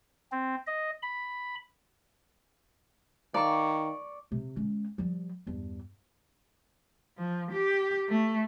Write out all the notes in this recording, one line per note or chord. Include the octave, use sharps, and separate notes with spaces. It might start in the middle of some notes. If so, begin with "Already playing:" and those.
C4
D#5
B5
D#3 D5 F5 A5 A#5 C#6
C3
G#3 C#4
F3 G3
E2 G2
F3
G4
A3